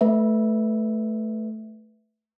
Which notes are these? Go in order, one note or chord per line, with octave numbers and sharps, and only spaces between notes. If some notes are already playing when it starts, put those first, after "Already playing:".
A3 B4 E5